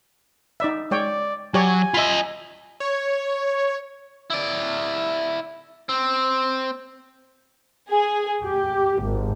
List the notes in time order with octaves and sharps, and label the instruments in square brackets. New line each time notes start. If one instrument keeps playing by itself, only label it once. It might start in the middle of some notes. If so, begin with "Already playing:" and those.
[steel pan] D#4 D5 E5
[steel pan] G#3 C#5 G5 [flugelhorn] D5
[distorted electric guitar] F#3 [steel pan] G4 C#5 D5 [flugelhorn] G#5
[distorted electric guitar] F4 D#5 [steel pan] E5 B5
[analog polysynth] C#5
[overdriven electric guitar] E4 D5
C4
[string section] G#4
G4
G#1